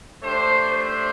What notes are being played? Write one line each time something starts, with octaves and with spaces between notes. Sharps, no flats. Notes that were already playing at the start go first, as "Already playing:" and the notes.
A3 D4 G4 C5
C5